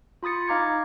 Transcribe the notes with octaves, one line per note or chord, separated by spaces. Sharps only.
F4 B5 D#6 A6 C#7
D#4 F5 A#5 D6 G#6 C#7